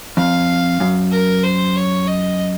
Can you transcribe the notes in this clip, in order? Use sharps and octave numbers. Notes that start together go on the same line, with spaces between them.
F2 F5
F#2
A#4
C5
C#5
D#5